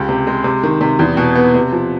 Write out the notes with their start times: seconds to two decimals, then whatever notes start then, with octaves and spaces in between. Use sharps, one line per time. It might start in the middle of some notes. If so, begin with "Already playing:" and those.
Already playing: C#2 G4
0.09 C3
0.27 G#3
0.44 C3
0.63 D#3
0.81 C3
0.99 E2
1.17 B2
1.35 B3
1.54 C3
1.72 F3